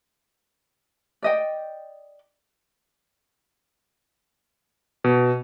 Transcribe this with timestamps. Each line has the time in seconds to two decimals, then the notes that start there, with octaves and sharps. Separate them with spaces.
1.22 D5 D#5 G5
5.04 B2